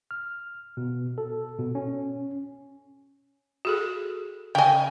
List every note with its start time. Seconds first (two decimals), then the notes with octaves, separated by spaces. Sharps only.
0.11 F6
0.77 B2
1.18 A4
1.59 B2
1.75 C#4
3.65 F#4 G#4 A4
4.55 C#3 D#5 G5 G#5